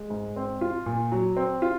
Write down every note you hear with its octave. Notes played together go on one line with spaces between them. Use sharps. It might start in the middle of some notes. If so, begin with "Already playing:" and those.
Already playing: G#3
G#2
C4
F4
A#2
F#3
C4
F4